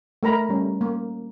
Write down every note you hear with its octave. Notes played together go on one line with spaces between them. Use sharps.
A3 A#4 A#5 B5
G3 C#4
A#3